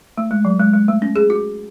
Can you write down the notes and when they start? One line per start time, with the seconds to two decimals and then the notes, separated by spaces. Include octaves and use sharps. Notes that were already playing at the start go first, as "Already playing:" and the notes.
0.17 A3
0.31 G#3
0.45 F#3
0.60 G#3
0.74 G#3
0.88 A3
1.02 C#4
1.16 G#4
1.30 F#4